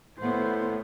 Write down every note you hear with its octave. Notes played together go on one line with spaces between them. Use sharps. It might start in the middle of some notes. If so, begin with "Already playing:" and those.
A2 B3 C5